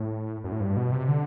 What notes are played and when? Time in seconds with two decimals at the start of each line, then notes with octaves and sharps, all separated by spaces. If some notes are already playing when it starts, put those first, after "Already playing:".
Already playing: A2
0.44 F#2
0.52 A2
0.61 G2
0.77 B2
0.92 C3
1.08 D3